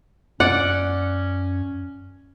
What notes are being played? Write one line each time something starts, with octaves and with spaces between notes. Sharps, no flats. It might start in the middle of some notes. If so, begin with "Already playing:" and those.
F#2 C#4 D5 F#5